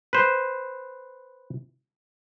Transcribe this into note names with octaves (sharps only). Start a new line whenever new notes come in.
B4 C5